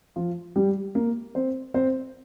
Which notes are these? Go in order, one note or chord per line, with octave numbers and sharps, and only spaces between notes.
F3 F4
G3 G4
A#3 A#4
C4 C5
C4 C5